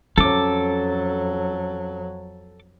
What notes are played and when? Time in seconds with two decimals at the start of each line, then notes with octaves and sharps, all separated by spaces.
0.18 F2 F#3 C#4 A4 D6